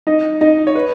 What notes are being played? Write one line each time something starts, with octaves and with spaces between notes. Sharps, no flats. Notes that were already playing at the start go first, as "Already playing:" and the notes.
D#4 D#5
D#4 D#5
C#5
B4